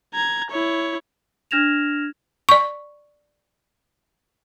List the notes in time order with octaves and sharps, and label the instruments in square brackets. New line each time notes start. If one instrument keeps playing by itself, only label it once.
[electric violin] A#5 G#6
E4 C#5
[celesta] D4 F6 G#6 A#6 E7 F7
[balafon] D5 C#6